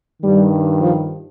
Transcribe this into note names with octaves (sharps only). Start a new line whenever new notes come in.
G2 D#3 G3
F3